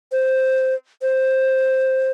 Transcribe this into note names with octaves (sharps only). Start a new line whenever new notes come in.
C5
C5